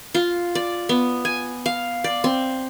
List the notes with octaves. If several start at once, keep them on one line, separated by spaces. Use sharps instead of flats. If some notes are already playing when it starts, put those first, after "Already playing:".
F4
D5
B3
G#5
F5
D5
C4